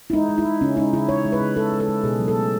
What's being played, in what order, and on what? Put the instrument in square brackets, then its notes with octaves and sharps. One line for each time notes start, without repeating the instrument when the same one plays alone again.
[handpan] E4
G#3 D#4
G#3
E4
G#3
C#3 C#4
G#3 D#4
C#3 E4
G#3 C#5
G#3
B4
C#3
G#3 A4
G#3
A4
G#3
B2 G#4
F#3
A4
A3